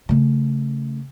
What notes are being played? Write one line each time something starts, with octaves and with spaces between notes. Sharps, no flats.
C#3 A3